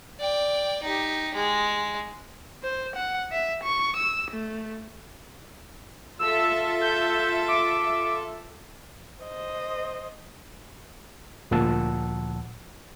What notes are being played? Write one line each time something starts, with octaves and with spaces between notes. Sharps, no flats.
D5 G5
D#4 G4
G#3
C5
F#5
E5
C#6
E6
A3
F4 A4 E5 E6
G6
D6
C5 D#5
D2 A#2 F3 F#5 A5 E6